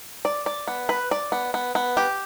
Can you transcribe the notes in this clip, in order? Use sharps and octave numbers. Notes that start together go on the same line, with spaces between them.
D5
D5
B3
B4
D5
B3
B3
B3
G4